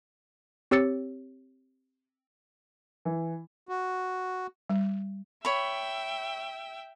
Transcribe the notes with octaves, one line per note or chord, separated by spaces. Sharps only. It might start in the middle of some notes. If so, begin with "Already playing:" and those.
C4 G4 C#5 E6 A6 C#7
E3
F#4
G3
C#5 E5 G5 B5